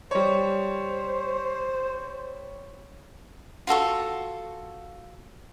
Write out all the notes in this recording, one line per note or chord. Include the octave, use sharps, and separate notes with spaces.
G3 C5 C#5
F4 F#4 A4 C#6